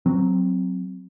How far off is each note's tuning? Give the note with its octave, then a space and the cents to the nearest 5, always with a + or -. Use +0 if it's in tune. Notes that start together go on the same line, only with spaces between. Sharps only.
F#3 +0 C4 +0